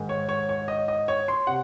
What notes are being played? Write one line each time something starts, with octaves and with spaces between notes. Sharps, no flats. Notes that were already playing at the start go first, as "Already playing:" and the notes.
Already playing: G#2 D#3 G#3
C#5
C#5
C#5
D#5
D#5
C#5
C6
C3 F#5